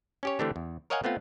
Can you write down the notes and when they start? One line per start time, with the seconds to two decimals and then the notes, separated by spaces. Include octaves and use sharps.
0.23 C#4 G4 C#5
0.39 D3 E3 A3 C4 D4 G4
0.56 E2
0.90 A#4 C#5 D#5 F5 F#5 G#5
1.04 A3 B3 C4 F4